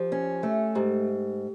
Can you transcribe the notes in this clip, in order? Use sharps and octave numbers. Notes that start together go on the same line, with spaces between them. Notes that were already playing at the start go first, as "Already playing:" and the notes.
Already playing: F3 G4
C#4
A3
G#2 G4